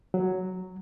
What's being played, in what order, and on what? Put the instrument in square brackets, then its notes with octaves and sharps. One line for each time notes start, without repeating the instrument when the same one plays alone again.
[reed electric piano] F#3